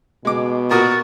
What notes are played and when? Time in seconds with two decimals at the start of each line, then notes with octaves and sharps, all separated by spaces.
0.25 B2 G#3 D6
0.71 A#2 F#4 A#4 D#6 A6